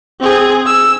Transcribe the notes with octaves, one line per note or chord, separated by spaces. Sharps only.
C4 G#4
E6